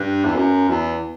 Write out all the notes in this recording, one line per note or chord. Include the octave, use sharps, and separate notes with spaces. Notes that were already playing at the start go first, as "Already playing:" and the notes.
Already playing: G2
E2
F#2
E2